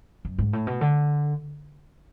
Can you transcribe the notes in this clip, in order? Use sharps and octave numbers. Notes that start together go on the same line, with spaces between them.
F#2
G#2
A2
B2
D3